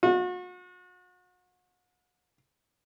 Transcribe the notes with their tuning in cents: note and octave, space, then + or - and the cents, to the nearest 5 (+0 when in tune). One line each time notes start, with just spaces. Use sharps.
F#4 -40